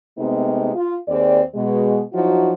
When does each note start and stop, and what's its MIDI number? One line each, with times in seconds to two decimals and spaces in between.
0.18 0.71 48
0.18 0.71 56
0.18 0.71 57
0.18 0.71 59
0.18 0.71 60
0.18 0.71 63
0.75 0.95 65
1.08 1.41 39
1.08 1.41 60
1.08 1.41 68
1.08 1.41 74
1.54 2.01 47
1.54 2.01 56
2.13 2.53 53
2.13 2.53 54
2.13 2.53 63
2.13 2.53 64
2.13 2.53 66